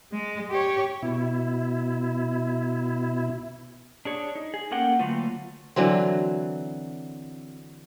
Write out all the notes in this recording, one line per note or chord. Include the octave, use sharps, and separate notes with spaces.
G#3
G4 C#5
B2 E4
D4 G#4 C#5
D#4
G#4
A3 A#3 C#4 A#4 F#5 G5
D3 F#3 A3 A#3 F4 B4
D3 E3 F#3 C4